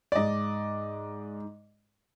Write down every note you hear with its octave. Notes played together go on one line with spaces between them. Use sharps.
G#2 D5 D#5 D6